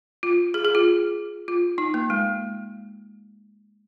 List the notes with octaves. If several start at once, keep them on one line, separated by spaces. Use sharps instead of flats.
F4
G#4
G#4
F4
F4
D#4
A#3
G#3